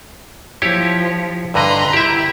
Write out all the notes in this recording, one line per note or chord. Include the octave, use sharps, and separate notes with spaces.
F3 E4 G4 C#5
G2 D3 B4 D#5 A#5 C6
E4 G4 E5